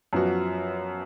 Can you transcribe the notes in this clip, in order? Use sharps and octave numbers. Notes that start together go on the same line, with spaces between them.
F#2 F3 B3 F#4